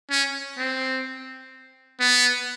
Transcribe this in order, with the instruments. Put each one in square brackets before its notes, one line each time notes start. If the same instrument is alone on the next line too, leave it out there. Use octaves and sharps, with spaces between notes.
[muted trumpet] C#4
C4
B3